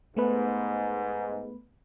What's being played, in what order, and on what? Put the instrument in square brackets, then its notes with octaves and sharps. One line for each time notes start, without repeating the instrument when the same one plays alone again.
[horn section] G#2 [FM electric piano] A3 B3 B4